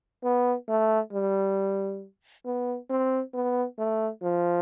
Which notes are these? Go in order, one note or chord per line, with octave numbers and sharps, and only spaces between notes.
B3
A3
G3
B3
C4
B3
A3
F3